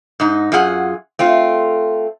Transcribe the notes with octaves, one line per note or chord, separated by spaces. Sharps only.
G#2 D#4
F#2 F4 G#4 F#5
A3 C4 F4